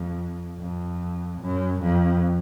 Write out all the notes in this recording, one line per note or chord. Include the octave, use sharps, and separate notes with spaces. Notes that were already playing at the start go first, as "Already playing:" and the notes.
Already playing: F2
F2
F#2
F2